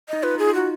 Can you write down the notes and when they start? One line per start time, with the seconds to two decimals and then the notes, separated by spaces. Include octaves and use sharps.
0.09 D#4 D#5
0.23 F4 B4
0.35 D#4
0.39 G#4
0.47 F4
0.55 D#4 F#4